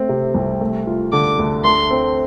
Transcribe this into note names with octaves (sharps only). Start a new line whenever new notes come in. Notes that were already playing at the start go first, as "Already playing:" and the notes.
Already playing: A3 C4
C3
C2
A3
F4
D3 D6
D2
A3 C6
C4